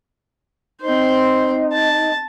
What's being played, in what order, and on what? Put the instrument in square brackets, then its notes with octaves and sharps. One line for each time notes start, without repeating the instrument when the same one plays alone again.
[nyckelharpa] C4 C5 [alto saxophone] D#4
[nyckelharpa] A5